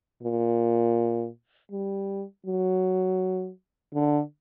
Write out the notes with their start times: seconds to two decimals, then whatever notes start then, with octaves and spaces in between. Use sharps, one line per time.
0.23 A#2
1.72 G3
2.46 F#3
3.94 D3